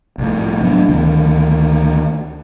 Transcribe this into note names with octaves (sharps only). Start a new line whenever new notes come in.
C2 A2
F#3 B3 D4
D2 D#3